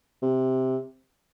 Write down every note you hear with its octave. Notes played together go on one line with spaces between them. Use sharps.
C3